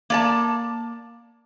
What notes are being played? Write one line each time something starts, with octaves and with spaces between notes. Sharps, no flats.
A#3 D5 A5